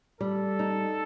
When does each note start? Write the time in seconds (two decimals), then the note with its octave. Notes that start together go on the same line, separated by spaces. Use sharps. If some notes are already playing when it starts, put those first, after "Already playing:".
0.20 G3 A4
0.59 D#4